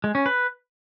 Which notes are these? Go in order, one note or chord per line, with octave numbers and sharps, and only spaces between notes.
G#3
C#4
B4